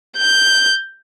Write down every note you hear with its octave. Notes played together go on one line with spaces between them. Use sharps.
G6